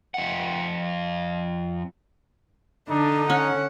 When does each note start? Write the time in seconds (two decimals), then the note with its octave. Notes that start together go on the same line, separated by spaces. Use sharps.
0.14 F2 F#5
2.89 D3 D4 D#4 A4
3.30 C#4 F#5